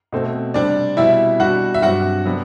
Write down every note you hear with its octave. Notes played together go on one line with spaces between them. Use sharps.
B2 A3 C4
C3 G3 C4 D4 D5
B2 G3 C4 E4 E5
B2 G3 D4 F#4 F#5
E5
G2 F#3 C4 F#4 F#5
C3 F#3 B3 D4